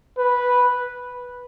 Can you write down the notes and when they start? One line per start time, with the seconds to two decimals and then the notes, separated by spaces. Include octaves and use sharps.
0.18 B4